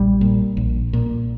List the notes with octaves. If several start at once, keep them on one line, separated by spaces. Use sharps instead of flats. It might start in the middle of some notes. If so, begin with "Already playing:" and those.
Already playing: A#1 G3
A#2
A#1
A#2